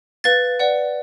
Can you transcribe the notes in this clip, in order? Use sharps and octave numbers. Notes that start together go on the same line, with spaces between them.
B4 F5 A6
B4 D5 F#5